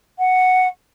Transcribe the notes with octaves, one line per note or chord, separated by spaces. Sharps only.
F#5